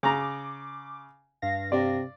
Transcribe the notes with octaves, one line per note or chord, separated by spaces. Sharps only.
C#3 A#5 D6
G2 F5 A#6
C3 D5